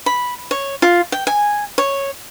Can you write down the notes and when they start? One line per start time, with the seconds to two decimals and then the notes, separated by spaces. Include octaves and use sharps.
0.06 B5
0.51 C#5
0.82 F4
1.12 G5
1.27 G#5
1.78 C#5